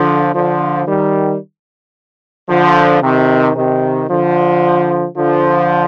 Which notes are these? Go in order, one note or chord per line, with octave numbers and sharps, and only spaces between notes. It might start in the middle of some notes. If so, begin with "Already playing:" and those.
Already playing: D3 F3
D3 F3
D#3 G3
D3 F3
C3 D#3
C3 D#3
D3 F3
D3 F3